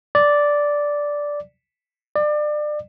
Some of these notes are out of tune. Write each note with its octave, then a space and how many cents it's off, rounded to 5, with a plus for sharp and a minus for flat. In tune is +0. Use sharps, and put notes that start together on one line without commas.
D5 -5
D5 +30